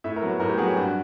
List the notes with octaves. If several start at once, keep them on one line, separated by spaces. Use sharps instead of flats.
A2 E5
A#4
F#3 B3
A2 A#4
G4
F#3 B3 G#4
G4
G2 F#4